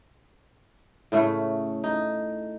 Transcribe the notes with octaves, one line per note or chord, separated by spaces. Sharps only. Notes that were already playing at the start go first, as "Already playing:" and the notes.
A2 C#3 A3
D#4